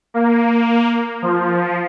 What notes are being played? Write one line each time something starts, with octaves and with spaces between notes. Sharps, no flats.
A#3
F3